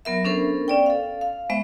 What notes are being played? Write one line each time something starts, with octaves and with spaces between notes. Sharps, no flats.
F#3 B3 A#4 E5
B3 C#4 D4 A4 A#4 C5
C#4 D5 G5
A4 F5
F5
G#3 B3 C5 E5